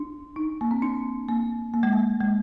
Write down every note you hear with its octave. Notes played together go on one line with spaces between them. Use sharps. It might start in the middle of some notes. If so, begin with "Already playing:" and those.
Already playing: D4
D#4
A#3
C4
D4
A#3
A#3
G#3
A#3
G#3